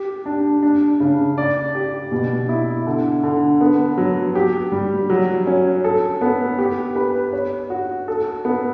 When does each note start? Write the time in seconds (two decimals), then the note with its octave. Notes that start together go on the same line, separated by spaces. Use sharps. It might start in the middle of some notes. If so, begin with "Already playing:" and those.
Already playing: G4
0.26 D4
0.63 D4
1.00 C#3
1.38 D5
1.75 G4
2.12 B2
2.49 E4
2.86 D3
3.23 D3
3.61 B3
3.98 F#3
4.35 G4
4.72 G3
5.10 F#3
5.47 C#4
5.84 A4
6.21 B3
6.58 G4
6.96 B4
7.33 C#5
7.70 F#4
8.08 A4
8.45 B3